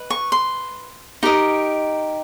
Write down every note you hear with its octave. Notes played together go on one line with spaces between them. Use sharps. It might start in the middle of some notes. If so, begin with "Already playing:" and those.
Already playing: B4 D#5
C#6
C6
D#4 G4 A#4 D#5